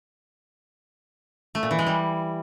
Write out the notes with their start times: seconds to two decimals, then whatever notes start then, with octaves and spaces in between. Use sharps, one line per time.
1.55 A3
1.63 A#2
1.71 E3
1.79 G#3
1.86 G3